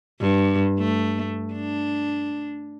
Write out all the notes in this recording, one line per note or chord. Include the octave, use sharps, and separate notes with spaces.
G2
A3
D4